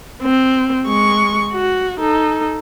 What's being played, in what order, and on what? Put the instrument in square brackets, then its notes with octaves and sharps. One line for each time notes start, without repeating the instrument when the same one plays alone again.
[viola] C4
G#3 C#6
F#4
D#4 A4